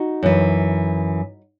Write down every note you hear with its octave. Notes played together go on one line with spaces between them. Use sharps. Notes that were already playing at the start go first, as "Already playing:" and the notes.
Already playing: D#4 F#4
F#2 E3